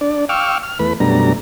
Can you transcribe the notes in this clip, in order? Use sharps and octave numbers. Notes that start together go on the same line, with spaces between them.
D4 D5
F5 G5 C#6 D6 E6 F6
F6
E2 A3 B4 B5
F#2 B2 G3 A3 D4 A#5